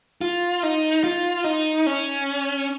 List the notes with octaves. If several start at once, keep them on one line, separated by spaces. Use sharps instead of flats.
F4
D#4
F4
D#4
C#4